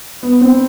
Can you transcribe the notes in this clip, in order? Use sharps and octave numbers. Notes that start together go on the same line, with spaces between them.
B3
C4